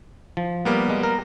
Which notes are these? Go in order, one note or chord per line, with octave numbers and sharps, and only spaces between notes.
F3
G3 A#3 B3
G#3
A#4